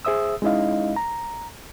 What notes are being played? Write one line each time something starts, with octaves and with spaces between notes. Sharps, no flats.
G#4 C5 E5 D#6 E6
G#3 C#4 D#4 E4 D#5 F5
A#5